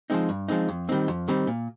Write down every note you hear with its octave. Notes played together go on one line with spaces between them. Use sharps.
F3 G#3 C4 D#4
G2
F3 G#3 C4 D#4
F2
D#3 G3 C4 D#4
F2
D#3 G3 C4 D#4
A#2